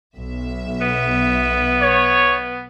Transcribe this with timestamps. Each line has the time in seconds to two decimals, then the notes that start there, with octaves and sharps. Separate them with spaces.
0.15 B1 E5
0.81 B3
1.81 C#5